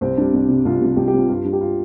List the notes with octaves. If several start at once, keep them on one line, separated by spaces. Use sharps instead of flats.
C2 C4
C3 G3 D4
C2
C3 G3
C2 F4
C3 G3
C2 G4
G4
C3 G3 F4
G2 F4
G3 D4
G4
F4